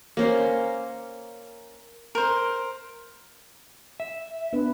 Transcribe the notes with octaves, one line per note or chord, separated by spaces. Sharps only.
A#3 C#4 C5
A#4 C5
E5
B3 D4 B4